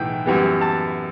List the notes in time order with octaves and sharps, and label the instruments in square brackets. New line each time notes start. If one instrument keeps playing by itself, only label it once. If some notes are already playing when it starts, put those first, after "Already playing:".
Already playing: [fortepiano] B1 A2 E3 G5
F#2 E3 G3 B3
A5